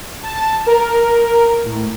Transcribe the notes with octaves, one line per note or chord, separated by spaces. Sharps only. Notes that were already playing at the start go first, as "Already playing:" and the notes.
A5
A#4
A2